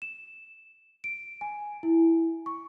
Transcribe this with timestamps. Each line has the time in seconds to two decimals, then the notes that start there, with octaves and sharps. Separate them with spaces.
0.02 E7
1.04 D7
1.41 G#5
1.83 E4
2.46 C#6